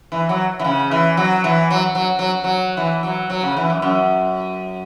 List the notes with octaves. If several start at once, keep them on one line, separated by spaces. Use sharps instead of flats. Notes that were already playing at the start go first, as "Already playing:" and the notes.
E3
F#3
E3
C#3
E3
F#3
E3
F#3
F#3
F#3
F#3
E3
F#3
F#3
C#3
E3
F#2
F#2